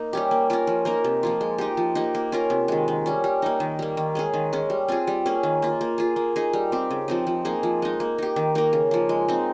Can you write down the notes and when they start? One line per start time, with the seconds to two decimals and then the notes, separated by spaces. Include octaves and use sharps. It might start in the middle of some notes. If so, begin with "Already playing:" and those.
Already playing: A#3 D#4
0.13 G3 C#4 G4
0.31 A#3
0.50 C#4 F4 A#4
0.67 F3
0.85 A#3 D#4 A#4
1.04 C3
1.23 F3 A#3 F4
1.41 G#3
1.58 D#4 G4
1.77 F3
1.95 A#3 D#4 G4
2.15 A#3
2.32 C#4 F4 A#4
2.50 C3
2.68 D#3 G#3
2.88 D#3
3.06 G3 C#4
3.24 G3
3.42 A#3 D#4
3.60 D#3
3.79 G3 A#3
3.97 D#3
4.15 G#3 C#4 G#4
4.34 D#3
4.53 G#3 C#4
4.70 G3
4.88 C4 F4 G#4
5.07 G3
5.26 A#3 C#4 G#4
5.43 D#3
5.62 A#3 F4
5.81 A#3
5.98 F4 G#4
6.16 A#3
6.36 D#4 G#4
6.53 G3
6.72 C4 G4
6.91 C#3
7.08 F3 C4 D#4
7.27 F3
7.45 A#3 D#4 G#4
7.63 F3
7.82 G#3 D#4
8.00 A#3
8.18 D#4 G4
8.36 D#3
8.55 A#3 D#4 A#4
8.73 C#3
8.91 F3 A#3
9.09 G#3
9.28 C4 D#4